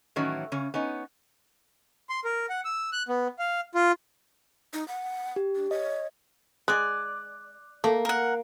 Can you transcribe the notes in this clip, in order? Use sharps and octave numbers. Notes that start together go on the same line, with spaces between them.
A2 D#3 E3 F#3 C#4
C#3 C#4
B3 C#4 D#4
C6
A#4
F#5
E6
F#6
B3
F5
F4
D#4
F#5
G4
D4
C#5 D#5
G#3 D5 G#5 F#6
A3 A#3
A#4 F#5